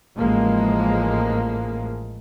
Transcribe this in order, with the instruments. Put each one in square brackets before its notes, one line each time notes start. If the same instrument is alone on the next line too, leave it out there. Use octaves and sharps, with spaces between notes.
[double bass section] A1 F3 G#3 A#3